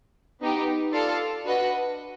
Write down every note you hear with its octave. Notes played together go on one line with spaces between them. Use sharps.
B3 D#4 G4
F4 A4 D5 F5
D4 F#4 B4 D#5 F#5